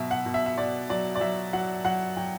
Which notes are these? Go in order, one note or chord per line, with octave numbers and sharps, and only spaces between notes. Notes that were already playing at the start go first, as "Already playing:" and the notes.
Already playing: B2 F#3 E5
F#5
B2
E5
E5
B2 D5
F#3 D5
D5
F#3 E5
F#3 F#5
F#3 F#5
F#3 G5